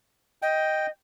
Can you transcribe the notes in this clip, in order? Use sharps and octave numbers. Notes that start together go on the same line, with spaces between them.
D#5 G5